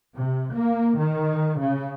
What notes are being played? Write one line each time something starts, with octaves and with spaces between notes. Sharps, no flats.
C3
A#3
D#3
C#3